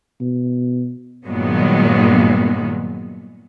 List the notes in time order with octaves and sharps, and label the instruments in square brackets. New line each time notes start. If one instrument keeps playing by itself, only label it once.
[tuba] B2
[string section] G2 A#2 D#3 F#3 G#3 B3